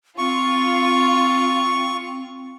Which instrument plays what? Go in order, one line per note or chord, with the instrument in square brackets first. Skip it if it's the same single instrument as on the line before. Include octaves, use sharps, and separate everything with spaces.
[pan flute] C4 [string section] F4 [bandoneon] C#6